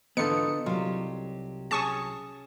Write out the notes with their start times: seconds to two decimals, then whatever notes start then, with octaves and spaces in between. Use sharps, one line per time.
0.17 G#2 D3 E3 B3 D#4 F4 A4 C#7
0.66 C2 F#3 F4 G4
1.71 C#4 G#4 A5 C#6 D#6